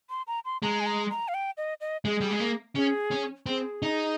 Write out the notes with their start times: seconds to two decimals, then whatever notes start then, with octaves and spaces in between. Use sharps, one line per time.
0.10 C6
0.27 A#5
0.45 C6
0.63 G#3 A#5
0.80 G#5
0.86 A#5
1.10 A#5
1.28 F5
1.34 G5
1.57 D#5
1.81 D#5
2.05 G#3 G#4
2.20 G3
2.31 G#3
2.40 A#3
2.76 C#4 G#4
3.11 C#4
3.46 C4 G#4
3.82 D#4